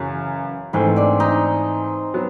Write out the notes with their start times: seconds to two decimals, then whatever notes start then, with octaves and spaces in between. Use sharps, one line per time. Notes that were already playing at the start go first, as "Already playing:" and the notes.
Already playing: F#2 C#3 E3
0.73 G#2 E3 A3 C4 C5
0.96 D4 D5
1.20 D#4 D#5
2.14 F#3 B3